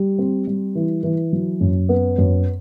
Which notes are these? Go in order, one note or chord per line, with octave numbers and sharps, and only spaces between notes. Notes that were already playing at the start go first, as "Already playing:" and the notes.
Already playing: G3
C4
G3
E3
E3
F#3
F#2
B3
F#2